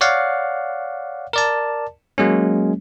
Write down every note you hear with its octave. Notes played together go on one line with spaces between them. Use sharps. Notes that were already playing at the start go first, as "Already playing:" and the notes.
C#5 D5 F5 F#5
A#4 D5 A5
F#3 G#3 A#3 C#4